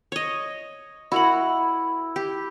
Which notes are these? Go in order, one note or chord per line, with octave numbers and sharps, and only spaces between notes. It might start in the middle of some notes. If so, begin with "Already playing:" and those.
C#5 D#5
E4 F#4 A#4 F#5
G4